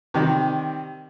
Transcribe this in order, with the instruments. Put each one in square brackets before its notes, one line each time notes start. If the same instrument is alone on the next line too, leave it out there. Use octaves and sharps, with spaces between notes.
[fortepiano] C3 D#3 G3